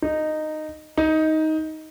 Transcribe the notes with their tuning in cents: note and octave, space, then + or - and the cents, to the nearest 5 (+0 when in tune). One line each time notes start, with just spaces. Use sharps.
D#4 -10
D#4 +15